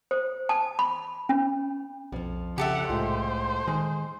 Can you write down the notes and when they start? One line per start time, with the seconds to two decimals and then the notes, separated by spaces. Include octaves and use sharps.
0.11 C5
0.49 A5
0.79 B5
1.29 C#4
2.12 B1 F2 F3
2.58 C#3 G4 A4 E5 F#5
2.90 C2 A2 G#3 F4 C5
3.67 D#3 G#3 G#4